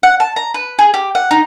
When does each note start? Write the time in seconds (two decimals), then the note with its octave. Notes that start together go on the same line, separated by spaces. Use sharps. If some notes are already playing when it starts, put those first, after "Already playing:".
0.03 F#5
0.20 A5
0.36 A#5
0.54 B4
0.79 G#4
0.94 G4
1.15 F#5
1.31 D#4